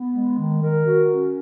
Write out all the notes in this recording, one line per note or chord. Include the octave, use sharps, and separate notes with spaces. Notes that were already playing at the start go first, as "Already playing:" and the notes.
Already playing: B3
G#3
D#3
A#4
F#4
C#4